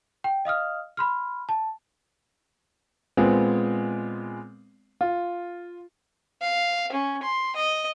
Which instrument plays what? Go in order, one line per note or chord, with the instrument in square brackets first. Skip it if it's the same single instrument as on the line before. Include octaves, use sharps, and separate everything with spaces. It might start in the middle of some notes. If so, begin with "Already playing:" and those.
[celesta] G5
D#5 F5 D#6 F6
B5 C6 F6
A5
[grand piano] A#2 G#3 B3 C4
F4
[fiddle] F5
C#4
C6
D#5